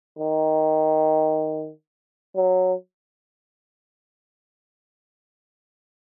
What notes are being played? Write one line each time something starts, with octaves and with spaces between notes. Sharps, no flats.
D#3
F#3